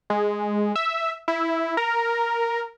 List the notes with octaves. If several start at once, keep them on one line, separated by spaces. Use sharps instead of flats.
G#3
E5
E4
A#4